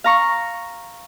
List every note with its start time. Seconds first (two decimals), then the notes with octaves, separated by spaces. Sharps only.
0.04 F5 A#5 C#6